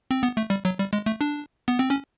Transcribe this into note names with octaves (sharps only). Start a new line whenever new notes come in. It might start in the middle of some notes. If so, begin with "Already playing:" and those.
C4
B3
A3
G3
F#3
G3
G#3
A3
D4
B3
C4
C#4